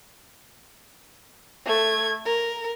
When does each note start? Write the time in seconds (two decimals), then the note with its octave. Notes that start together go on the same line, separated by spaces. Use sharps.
1.65 A3 G#6
2.25 A#4